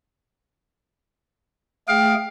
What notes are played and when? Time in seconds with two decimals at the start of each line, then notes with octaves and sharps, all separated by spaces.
1.88 A3 G#4 F5 G5